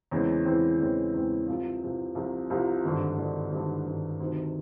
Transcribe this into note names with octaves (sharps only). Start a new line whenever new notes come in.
E2 C#3 E3 G#3 C4
E2 C#3 E3 G#3 C4
E2 C#3 E3 G#3 C4
E2 C#3 E3 G#3 C4
C2 C3 F3
C2 C3 F3
C2 C3 F3
C2 C3 F3
G#1 G2 D3
G#1 G2 D3
G#1 G2 D3
G#1 G2 D3
D2 C3 D#3